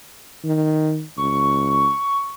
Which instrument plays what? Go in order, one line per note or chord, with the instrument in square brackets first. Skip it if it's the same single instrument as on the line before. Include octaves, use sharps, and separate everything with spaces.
[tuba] D#3
[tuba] C#2 [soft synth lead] C#6